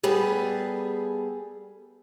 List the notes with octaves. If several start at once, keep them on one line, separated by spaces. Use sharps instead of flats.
G3 B3 G#4 A4